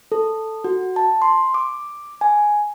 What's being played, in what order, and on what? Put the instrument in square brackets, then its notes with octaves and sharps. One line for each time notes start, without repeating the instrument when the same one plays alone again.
[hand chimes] A4
F#4
A5
C6
D6
G#5